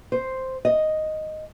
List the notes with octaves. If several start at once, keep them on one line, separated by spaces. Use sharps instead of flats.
C5
D#5